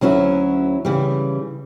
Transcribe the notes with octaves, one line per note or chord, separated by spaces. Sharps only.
D2 F#3 C#4 E4 F#4
C#3 E3 G3